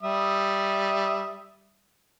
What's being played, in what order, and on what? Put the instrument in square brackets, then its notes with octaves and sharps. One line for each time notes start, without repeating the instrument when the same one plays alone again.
[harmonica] G3 E5 D#6